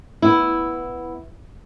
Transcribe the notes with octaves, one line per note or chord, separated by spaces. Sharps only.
B3 E4